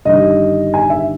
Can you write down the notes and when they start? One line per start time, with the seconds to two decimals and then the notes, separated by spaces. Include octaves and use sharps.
0.05 G1 G2 D#3 G3 D#5
0.74 G#5
0.90 E5